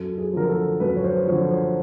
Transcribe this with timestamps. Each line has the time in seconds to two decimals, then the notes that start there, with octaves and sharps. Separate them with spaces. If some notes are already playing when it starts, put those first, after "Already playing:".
Already playing: F#2 A4
0.18 G#4
0.33 D3 F3 A#4
0.49 A4
0.80 F#2 B4
0.96 C#5
1.04 C5
1.28 D3 F3 C#5
1.51 C5